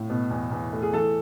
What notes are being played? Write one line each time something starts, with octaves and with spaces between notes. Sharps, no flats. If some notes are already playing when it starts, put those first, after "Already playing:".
Already playing: A2
B2
E2
E2
A3
G#4
E3 A4